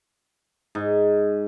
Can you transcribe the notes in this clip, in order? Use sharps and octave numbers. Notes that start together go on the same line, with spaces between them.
G#2